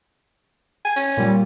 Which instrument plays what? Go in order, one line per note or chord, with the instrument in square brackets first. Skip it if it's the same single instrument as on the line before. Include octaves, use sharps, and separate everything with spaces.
[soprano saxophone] G#5
C#4
[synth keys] A#2 G3